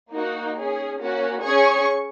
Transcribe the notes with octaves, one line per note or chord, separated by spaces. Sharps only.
A#3 D#4 F#4
C#4 G#4
A#3 C#4 F#4
C#4 G#4 G#5 C#6